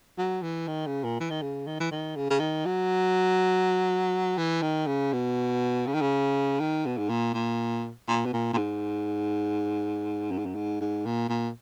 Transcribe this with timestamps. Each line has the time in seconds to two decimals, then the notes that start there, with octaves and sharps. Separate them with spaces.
0.18 F#3
0.43 E3
0.68 D#3
0.86 C#3
1.04 A#2
1.20 E3
1.30 D#3
1.42 C#3
1.67 D#3
1.80 E3
1.91 D#3
2.16 C#3
2.30 C#3
2.40 D#3
2.66 F#3
4.38 E3
4.62 D#3
4.87 C#3
5.13 B2
5.87 C#3
5.94 D#3
6.01 C#3
6.60 D#3
6.86 B2
6.98 G#2
7.09 A#2
7.34 A#2
8.08 A#2
8.25 B2
8.33 A#2
8.53 A#2
8.57 G#2
10.31 F#2
10.38 G#2
10.45 F#2
10.55 G#2
10.81 G#2
11.06 A#2
11.29 A#2